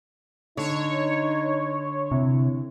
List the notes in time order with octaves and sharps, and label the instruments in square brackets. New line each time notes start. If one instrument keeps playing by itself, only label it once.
[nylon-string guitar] D3 [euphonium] D#4 [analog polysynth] C#5
[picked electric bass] C3 [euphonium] E4